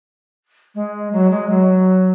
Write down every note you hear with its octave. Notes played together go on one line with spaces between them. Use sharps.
G#3
F#3
G#3
F#3